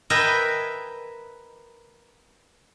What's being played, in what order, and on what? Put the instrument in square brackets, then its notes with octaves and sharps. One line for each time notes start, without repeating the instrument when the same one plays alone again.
[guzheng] A#4 B4 D#5 E5 G5 G#5